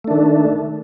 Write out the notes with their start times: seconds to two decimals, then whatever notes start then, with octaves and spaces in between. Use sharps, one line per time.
0.04 A3
0.08 D4
0.11 D#3